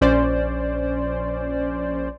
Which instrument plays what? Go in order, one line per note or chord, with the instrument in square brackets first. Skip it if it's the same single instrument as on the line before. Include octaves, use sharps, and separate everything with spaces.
[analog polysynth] A#1 C#4 C5 D5